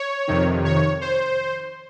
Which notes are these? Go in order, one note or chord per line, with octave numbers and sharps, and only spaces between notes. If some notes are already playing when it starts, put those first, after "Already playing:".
Already playing: C#5
F2 C3 D#3
C#5
C5